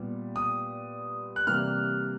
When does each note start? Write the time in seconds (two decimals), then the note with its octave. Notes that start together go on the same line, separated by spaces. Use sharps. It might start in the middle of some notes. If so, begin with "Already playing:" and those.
Already playing: A#2 G3 B3
0.36 D#6
1.36 F#6
1.47 C3 E3 G3 A#3 F6